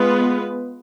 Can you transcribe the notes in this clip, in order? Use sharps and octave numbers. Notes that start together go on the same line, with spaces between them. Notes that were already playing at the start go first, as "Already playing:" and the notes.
Already playing: G#3 B3 F4 B4